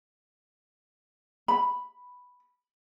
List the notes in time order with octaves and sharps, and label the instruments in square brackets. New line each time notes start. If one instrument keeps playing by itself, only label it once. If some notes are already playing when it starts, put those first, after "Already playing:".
[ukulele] B5